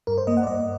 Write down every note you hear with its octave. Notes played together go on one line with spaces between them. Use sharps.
G2 A#4
C5
A#3 D#5
F#5
D5
G2 D#5